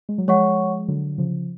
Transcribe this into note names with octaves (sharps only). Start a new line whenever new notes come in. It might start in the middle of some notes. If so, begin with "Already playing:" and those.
G#3
F#3
F3 G#3 C#5 F#5 C#6
D3 F#3
C#3 F3